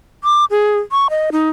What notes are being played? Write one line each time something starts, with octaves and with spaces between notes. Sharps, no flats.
D6
G#4
C#6
D#5
D#4